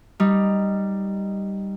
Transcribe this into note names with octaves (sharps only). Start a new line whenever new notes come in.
G3 D#4